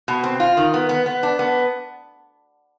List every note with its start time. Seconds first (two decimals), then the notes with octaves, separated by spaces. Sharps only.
0.08 B2
0.23 C4
0.40 F4
0.57 D#3
0.74 B3
0.89 B3
1.06 B3
1.23 D4
1.39 B3